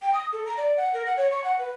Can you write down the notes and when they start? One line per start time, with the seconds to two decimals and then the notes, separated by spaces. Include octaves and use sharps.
0.01 G5
0.13 D#6
0.32 A4
0.45 A#5
0.57 D5
0.76 F#5
0.93 A#4
1.05 F#5
1.16 C#5
1.31 C#6
1.43 F#5
1.58 B4